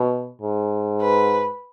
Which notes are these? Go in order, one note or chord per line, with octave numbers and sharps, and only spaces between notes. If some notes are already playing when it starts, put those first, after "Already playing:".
Already playing: B2
G#2
B4